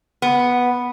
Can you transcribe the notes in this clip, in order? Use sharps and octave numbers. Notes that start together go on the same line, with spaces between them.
B3